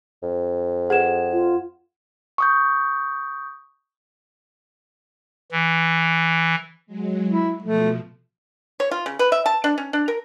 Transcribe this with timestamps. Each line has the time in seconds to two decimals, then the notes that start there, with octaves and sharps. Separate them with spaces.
0.23 F2
0.90 G#4 B4 F#5 G#6 E7
1.32 F4
2.38 C#6 D#6 G6
5.52 E3
6.86 F#3 G#3
7.29 E4
7.62 B2 F3 A3
8.80 C#5
8.91 F4
9.06 C#3
9.19 B4
9.32 E5
9.46 A5
9.64 D4
9.78 C#4
9.93 D4
10.08 A#4